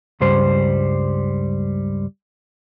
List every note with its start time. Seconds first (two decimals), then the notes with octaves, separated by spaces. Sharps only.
0.21 C#2 G2 G3 C5